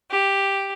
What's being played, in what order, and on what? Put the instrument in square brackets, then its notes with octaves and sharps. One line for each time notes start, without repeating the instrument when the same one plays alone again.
[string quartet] G4